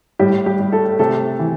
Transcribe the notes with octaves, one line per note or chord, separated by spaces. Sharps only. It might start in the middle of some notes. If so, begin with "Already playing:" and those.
A2 G3 G4
G3 G4
G3
A3 A4
C3 A3 A4
E3